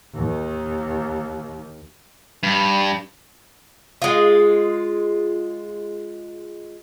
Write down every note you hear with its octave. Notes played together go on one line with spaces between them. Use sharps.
D#2 D#3
G2
G#3 F4